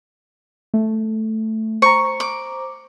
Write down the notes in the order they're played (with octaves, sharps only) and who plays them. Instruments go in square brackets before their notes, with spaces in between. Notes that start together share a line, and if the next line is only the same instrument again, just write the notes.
[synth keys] A3
[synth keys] C5 A#5 [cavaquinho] C#6
[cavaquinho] D6